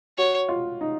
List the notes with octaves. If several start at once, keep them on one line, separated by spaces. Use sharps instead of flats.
F#4 C#5
F4
D#4